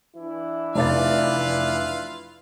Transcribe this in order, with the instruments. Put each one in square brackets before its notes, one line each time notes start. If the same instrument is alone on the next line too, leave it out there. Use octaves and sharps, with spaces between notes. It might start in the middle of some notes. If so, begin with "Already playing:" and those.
[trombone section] E3 D4 E4
[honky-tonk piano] F1 D5 A6 [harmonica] F4 B4 F5